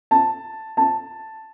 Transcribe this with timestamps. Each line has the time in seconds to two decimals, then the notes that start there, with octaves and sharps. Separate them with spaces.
0.11 A5
0.77 A5